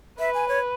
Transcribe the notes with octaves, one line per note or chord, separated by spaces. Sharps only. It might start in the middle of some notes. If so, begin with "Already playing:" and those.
B4 E5
G#5
C#5